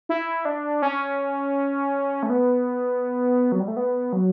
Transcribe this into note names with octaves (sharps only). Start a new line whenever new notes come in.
E4
D4
C#4
A3
B3
F#3
G3
A3
B3
F#3